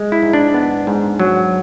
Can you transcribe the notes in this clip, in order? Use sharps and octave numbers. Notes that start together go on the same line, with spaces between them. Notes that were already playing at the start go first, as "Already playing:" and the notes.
Already playing: G#3
E4
G#2
D4
B3
G#2
F#3